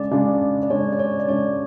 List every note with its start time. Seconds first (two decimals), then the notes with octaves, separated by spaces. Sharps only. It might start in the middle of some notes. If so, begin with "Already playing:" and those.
Already playing: C#3 G#3 D4 D5
0.11 C#3 G#3 D4
0.63 D5
0.70 C#3 G#3 D4 C#5
0.93 D5
0.99 C#5
1.20 D5
1.28 C#3 G#3 D4 C#5